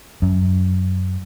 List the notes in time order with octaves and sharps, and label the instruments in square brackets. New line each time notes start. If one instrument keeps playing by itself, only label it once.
[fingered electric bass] F#2